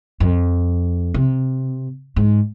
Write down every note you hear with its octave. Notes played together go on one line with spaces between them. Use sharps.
F2
C3
G#2